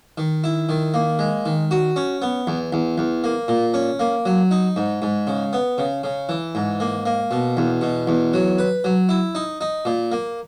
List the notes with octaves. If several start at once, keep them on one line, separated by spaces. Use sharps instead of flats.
D#3
E4
D#3
A#3
G#3
D#3
F#4
C#4
B3
E2
E2
E2
A#3
A#2
C#4
A#3
F#3
D#4
G#2
G#2
C#3
B3
C#3
C#3
E3
G#2
A#3
A#3
B2
E2
B2
E2
F#3
B4
F#3
E4
D#4
D#4
A#2
A#3